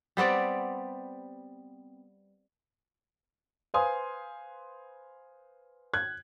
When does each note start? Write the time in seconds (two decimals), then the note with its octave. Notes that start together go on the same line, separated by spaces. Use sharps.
0.17 G3 B3 C4 D5
3.74 B4 C5 F5 G#5 C6 D#6
5.94 F#6 G#6